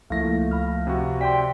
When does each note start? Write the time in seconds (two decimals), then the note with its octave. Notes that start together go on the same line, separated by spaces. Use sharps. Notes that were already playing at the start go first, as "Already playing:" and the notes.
0.10 C#2 F3 A3 A#3 E4 E5 F5 A#6
0.51 F5 B5 F6
0.87 C3 F#4
1.21 D5 G5 C6 B6